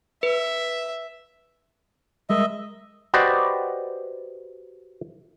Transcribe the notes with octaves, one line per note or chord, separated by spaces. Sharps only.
B4 E5
G3 G#3 A#4 D#5 E5
F#4 G4 B4 C5 D5 D#5